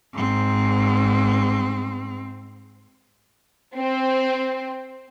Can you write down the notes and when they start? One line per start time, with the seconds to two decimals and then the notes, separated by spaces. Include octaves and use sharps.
0.14 G#2 C4
3.77 C4